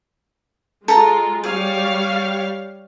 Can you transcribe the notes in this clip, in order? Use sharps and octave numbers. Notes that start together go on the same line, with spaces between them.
G#3 F4 A4 A#5
G3 G#4 C#5 F5